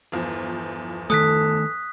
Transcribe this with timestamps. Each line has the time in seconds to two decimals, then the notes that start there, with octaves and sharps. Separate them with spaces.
0.12 G1 E2 F3
1.10 D#3 A3 A4 D#6 F#6 B6